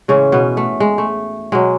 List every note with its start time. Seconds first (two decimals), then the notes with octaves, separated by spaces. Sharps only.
0.08 A2 C#3 E3 G#3 C#4
0.32 B2 B3
0.57 A3
0.80 G#3
0.98 A3
1.52 B2 F#3 G#3